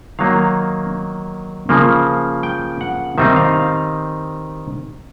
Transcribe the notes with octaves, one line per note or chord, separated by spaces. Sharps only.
D#3 F#3 A#3 D#4 F5
C#3 F3 A#3
G5
F#5
D#3 G3 C4 D#4 E5
F5